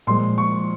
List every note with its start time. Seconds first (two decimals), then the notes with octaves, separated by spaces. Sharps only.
0.07 A#2 F3 G#3 C6
0.38 C#6